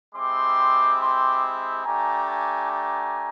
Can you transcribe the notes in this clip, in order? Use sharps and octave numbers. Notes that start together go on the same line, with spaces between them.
G#3 C4 E4 G4 C6 D6
C6 D6
A3 D4 G4 G#5 A#5
G#5 A#5
G#5 A#5